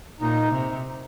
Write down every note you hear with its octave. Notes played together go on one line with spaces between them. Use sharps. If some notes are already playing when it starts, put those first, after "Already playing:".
A#2 D#4
C3